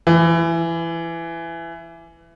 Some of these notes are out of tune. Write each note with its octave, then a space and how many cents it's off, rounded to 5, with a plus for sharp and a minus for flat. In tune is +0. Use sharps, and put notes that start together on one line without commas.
E3 +20